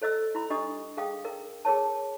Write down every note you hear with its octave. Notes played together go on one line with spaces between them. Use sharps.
A4 C5 D#5 E6
E4 B5
D4 G4 D#5 D#6
G#4 F5 G5 D#6
A#4
G#4 A#4 C#5 A5